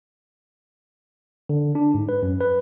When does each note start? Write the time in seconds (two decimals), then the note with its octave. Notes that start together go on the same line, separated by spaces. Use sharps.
1.49 D3
1.75 D4
1.94 G#2
2.09 B4
2.22 F#2
2.41 B4